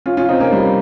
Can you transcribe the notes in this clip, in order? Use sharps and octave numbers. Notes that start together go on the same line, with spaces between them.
C#4 F4
C#4 F4
C4 D#4
A#3 C#4
G3 A#3